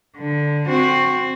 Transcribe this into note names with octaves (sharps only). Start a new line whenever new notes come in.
D3
C4 F#4